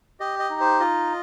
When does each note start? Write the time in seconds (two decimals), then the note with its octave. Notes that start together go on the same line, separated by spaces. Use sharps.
0.20 G4 D#5
0.39 D#5
0.50 D#4
0.60 C5
0.80 F4 D#5